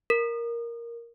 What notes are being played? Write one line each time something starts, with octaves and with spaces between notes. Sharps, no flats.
A#4